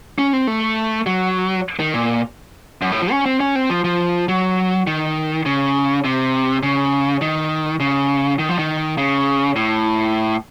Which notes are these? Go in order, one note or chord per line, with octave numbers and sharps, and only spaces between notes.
C#4
C4
A3
F#3
D#3
A#2
F#2
A2
F3
C#4
C4
C#4
C4
F3
F3
F#3
D#3
C#3
C3
C#3
D#3
C#3
D#3
F3
D#3
C#3
A2